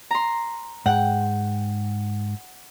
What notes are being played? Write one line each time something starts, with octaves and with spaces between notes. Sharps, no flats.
A#5 C6
G#2 F#5 G5